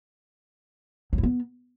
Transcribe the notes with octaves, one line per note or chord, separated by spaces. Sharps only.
F#3
E4
B3